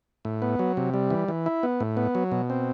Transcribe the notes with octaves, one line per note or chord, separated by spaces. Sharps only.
A2
B3
F#3
C3
G3
E3
E3
E4
B3
A2
B3
F#3
B2
C4